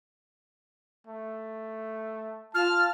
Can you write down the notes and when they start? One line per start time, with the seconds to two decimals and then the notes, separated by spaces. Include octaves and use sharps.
1.07 A3
2.55 F4 A5 F6